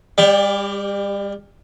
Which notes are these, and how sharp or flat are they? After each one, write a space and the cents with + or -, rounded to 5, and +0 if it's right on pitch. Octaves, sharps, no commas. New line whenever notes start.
G3 +35 G4 +0 D5 -20